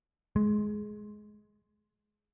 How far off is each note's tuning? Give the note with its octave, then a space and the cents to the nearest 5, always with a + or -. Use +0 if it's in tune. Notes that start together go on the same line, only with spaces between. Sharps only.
G#3 +15